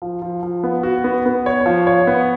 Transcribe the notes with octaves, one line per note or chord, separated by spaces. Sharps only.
F3
F3
F3
B3
F#4
B3
B3
C#5
F3
C#5
B3